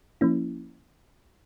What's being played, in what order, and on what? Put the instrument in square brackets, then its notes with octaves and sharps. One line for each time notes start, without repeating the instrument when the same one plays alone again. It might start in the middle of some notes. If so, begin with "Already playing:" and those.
[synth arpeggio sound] F3 A#3 C#4 E4